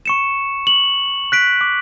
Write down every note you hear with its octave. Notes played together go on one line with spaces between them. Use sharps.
C#6 C#7 E7
F#7
F#6 B6 D7
D6